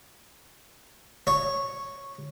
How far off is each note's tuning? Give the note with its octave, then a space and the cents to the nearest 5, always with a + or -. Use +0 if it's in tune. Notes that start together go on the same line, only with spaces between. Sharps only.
C#5 -5